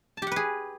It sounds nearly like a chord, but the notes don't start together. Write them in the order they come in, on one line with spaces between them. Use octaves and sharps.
A5 G4 F#5 B4 G#4